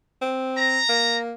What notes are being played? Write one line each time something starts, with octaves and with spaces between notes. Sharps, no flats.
C4
A#5
A#3